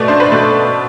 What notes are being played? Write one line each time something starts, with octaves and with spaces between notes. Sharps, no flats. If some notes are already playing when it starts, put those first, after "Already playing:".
Already playing: B2 A3 D5
D4 C5
B4
B2 A4